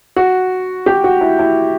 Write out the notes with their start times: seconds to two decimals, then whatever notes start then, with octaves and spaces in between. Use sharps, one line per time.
0.16 F#4
0.86 G4
1.04 F#4
1.21 E4
1.39 E4